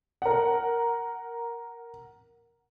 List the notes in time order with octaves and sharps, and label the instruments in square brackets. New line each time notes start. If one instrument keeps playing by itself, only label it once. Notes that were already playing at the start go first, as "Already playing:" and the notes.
[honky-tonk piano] A#4 F#5